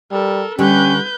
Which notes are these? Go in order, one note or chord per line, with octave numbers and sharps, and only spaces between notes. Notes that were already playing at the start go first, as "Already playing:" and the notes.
G3 A4 A#4
D3 G3 C#4 G4 B4 G6